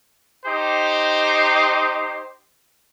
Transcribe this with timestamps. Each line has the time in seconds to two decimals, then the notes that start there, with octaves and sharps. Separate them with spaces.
0.45 D#4 G4 C5